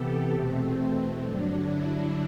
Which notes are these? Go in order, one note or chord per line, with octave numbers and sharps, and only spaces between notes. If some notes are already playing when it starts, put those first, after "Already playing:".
Already playing: C3 E3 B3 G4 A4
E2 B2 A3 C4
G2 D3 F#3 D4
E4